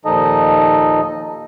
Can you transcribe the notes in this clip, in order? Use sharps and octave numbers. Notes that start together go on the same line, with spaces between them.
D#2 A#2 F3 D#4 A4 D#5